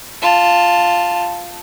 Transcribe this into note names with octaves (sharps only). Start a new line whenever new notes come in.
F4 A5